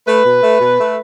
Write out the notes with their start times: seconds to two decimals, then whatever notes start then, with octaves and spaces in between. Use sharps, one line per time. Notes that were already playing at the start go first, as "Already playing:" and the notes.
0.06 A3 B4
0.23 B2
0.42 A3
0.60 B2
0.78 A3